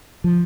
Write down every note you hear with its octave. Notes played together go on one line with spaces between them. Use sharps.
F3